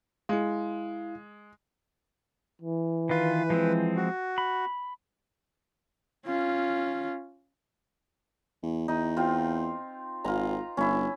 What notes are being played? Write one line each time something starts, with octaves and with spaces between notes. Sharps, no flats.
G#3 E4 F5
E3
D#3 F4 B4
F3 G#3 C4
F#4
B5
C#4 F4
E2
E2 D#4
C4 F4
G#1 F4 A#5
G1 C#4 E4